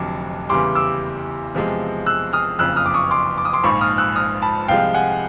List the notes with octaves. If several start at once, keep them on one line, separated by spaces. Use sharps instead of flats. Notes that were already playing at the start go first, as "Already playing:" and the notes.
Already playing: F1 F2 D3 F#3 A5 D6
E2 C#3 E3 G3 C6 D6
D6 E6
E2 C3 F3 G#3
E6 F#6
D#6 F6
F#1 F2 C#3 E6 F#6
D#6 F6
D6
C#6 D#6
C6 D6
D6
D#6
C6 D6
A#1 G#2 F3 B5 C#6
D#6 F6
E6 F#6
D#6 F6
A5 B5
C2 C3 F3 G#3 F5 G5
F#5 G#5